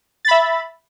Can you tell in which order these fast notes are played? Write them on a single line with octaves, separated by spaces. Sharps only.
A6 B5 E5